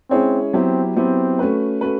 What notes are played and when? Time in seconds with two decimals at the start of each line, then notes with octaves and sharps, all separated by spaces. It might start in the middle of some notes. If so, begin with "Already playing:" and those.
0.10 G#3 C4 C#4 E4 G#4 C#5
0.53 F#3 B3 C4 E4 G4
0.96 F#3 B3 C4 E4 G4
1.39 A3 C#4 F#4 B4
1.81 A3 C#4 F#4 B4